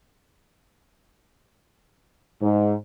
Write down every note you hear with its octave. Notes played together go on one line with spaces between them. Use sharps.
G#2